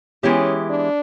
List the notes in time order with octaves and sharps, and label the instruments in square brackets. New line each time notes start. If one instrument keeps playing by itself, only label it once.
[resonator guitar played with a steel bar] E3 G#3 B3 E4 G4 [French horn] C#4
[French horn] D4